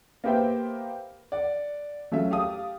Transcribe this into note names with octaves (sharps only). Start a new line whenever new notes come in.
A#3 B3 G4 C5 E5 G5
D5 F#5
F#3 A3 C#4 F4 E5
G4 F5 A5 D#6